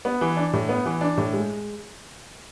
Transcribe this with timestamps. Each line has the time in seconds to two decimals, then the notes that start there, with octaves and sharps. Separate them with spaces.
0.05 B3
0.21 E3
0.37 D4
0.53 A2
0.69 B3
0.85 E3
1.01 D4
1.18 A2
1.33 G#3